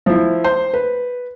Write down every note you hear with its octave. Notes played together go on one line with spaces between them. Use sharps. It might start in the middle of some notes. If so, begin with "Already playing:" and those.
F3 E4
C5
B4